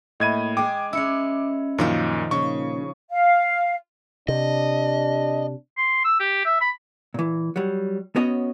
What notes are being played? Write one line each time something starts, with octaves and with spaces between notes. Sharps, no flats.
A2 A#3 D#5 E5 B5 G#6 D#7
G#3 G#4 G5 D6
G#3 C#4 E4 E6 C#7
F#2 A#2 D#3 F3 F5
A#2 C#3 C#6
F5
C3 D4 D#5
C6
E6
G4
E5
B5
A#2 E3
F#3 G3
B3 C#4 F#4 C#5 D#5